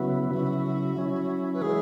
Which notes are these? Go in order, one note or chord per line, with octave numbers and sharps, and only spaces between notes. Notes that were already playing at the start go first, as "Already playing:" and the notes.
Already playing: C#3 F#3 B3 E4 F#4
C#3 F#3 E4 F#4
F#3 C#4 E4
B4
E3 G#3 E4 G#4